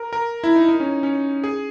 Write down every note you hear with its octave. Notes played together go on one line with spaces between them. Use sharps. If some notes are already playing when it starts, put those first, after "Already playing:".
Already playing: A#4
A#4
E4
D#4
D#4
C#4
C#4
G#4